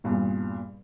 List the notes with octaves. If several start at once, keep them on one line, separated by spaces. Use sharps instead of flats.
E2 G2 A#2